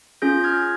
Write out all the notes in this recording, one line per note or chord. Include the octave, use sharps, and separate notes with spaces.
C#4 F4 G#4 G6 A#6
F6 G#6